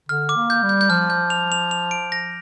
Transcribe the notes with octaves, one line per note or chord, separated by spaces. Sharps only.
D3 F6
D6
A#3
G6
G3
G6
G6
F3 F6
G6
F7
F7
F7
D7
A#6